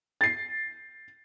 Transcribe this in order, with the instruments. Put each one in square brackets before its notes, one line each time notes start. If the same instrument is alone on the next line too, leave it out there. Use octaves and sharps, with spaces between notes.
[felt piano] A6 C7